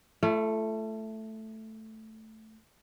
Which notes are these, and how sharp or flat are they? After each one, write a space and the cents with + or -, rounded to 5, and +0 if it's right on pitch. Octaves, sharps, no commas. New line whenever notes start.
A3 +0 F4 -45